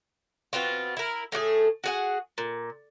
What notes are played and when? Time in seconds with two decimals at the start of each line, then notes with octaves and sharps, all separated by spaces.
0.53 B2 B3 C4 F4
0.97 E4 A#4
1.32 A2 A3 F#4 G#4
1.84 F#4 G#4 F#5
2.38 A#2